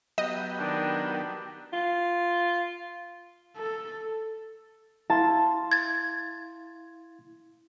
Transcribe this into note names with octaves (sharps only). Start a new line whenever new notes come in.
F#3 B3 G4 D#5
D#3 D4
F4
A4
E4 F5 A5 C6
G#6 A6